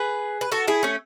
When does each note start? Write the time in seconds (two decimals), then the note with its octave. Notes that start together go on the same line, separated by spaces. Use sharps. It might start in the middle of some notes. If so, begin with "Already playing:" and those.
Already playing: G#4 B4
0.41 B4
0.52 F#4 A4
0.68 E4 G#4
0.83 A3 C#4